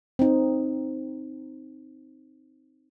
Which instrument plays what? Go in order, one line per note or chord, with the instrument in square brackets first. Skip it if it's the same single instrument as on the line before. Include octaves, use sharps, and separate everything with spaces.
[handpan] C4 D#4